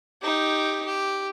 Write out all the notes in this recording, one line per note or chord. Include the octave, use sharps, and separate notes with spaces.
D#4 G4
G4